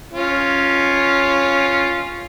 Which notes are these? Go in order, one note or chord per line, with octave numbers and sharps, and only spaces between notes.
C#4 F4